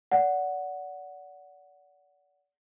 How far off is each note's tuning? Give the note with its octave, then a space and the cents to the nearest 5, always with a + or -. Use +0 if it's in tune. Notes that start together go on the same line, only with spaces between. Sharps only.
D5 -30 F#5 +0